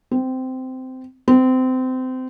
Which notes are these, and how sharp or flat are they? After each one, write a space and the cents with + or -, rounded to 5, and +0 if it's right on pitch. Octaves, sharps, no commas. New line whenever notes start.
C4 -15
C4 -25